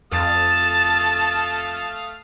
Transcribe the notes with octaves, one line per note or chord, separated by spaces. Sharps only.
F2 A3 F5 A5 D#6